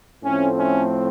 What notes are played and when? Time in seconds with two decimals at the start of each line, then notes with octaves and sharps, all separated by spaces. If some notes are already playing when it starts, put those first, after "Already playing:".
0.24 A2 F3 A3 C4 C#4
0.58 C#4